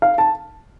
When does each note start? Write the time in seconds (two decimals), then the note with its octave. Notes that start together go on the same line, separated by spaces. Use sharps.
0.02 F5
0.18 A5